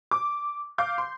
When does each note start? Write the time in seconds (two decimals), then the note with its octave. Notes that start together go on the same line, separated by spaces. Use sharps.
0.11 D6
0.78 F5 D6 G6
0.98 C6